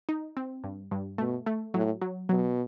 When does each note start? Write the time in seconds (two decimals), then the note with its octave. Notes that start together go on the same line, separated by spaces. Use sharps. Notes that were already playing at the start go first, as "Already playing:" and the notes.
0.09 D#4
0.37 C4
0.64 G2
0.91 G2
1.18 B2 A3
1.46 A3
1.74 A2 F#3
2.02 F#3
2.29 B2 F#3